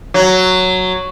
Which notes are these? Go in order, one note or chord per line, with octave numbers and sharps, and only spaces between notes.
F#3